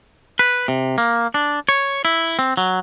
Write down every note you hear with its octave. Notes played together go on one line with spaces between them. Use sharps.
B4
C3
A#3
D4
C#5
E4
C4
F#3